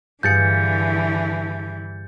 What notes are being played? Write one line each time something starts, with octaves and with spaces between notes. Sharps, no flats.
G2 D3 E3 G#4 F5 G6 A6 C#7